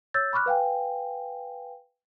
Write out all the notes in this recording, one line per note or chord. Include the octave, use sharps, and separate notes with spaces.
C#5 E6 G6 A6
B5 C#6 D6 F6 F#6
B4 F5 G5 G#5